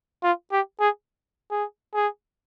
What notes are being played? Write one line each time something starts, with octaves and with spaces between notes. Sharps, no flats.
F4
G4
G#4
G#4
G#4